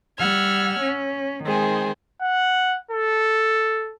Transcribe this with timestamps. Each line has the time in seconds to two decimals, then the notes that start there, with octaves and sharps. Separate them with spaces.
0.18 G3 F#5 E6 F6 G#6
0.80 C#4
1.44 D#3 G#3 C4 G#4
2.22 F#5
2.91 A4